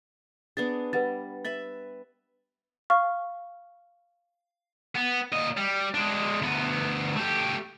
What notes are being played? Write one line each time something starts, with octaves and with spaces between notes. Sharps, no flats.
B3 D4 G#4 A6
G3 B4 F#5 A6
B4 E5 B5 A6
F5 C#6 F6
B3
A#2 D#5
G3
G#3 D4
D2 B3
A3 G4